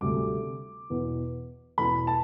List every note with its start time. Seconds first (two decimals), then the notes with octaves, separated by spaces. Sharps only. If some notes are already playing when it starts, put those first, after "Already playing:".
0.01 D2 C3 G3 D6
0.90 E2 B2 B3
1.78 E2 B2 B3 B5
2.07 A5